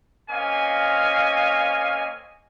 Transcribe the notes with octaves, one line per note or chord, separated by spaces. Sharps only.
A#3 C4 C#4 D#5 F5 G#5